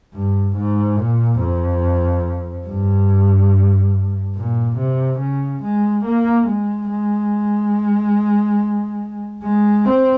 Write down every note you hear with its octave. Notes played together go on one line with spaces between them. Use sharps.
G2
G#2
A#2
F2
G2
A#2
C3
C#3
G#3
A#3
G#3
G#3
G#3
C4